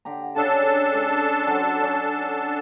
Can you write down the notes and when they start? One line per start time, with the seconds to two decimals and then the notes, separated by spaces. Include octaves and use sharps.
0.05 D3 G4 A#5
0.36 C#3 D4 A4 D#5 A5
0.94 G#3
1.47 F#3 C5
1.81 C#4 D#4